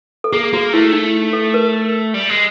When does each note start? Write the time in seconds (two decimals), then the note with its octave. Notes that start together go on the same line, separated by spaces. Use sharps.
0.24 A4
0.32 A#3 G#4
0.53 A#3 F#4
0.73 A3 E4
0.93 D#4
1.33 A4
1.54 A#4
2.14 G3
2.29 G#3